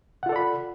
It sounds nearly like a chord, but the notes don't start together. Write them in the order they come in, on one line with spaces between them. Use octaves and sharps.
F#5 F4 A4 D5 B5